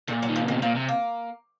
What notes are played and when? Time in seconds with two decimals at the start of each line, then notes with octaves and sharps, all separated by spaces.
0.08 A#2 A3
0.22 F#3
0.29 D#3
0.36 F3
0.40 C#3
0.48 D#3
0.51 C3
0.62 A#2 F3
0.75 C3
0.89 A#3